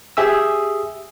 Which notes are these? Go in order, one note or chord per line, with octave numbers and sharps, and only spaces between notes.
G4 G#4 E5 D#6 E6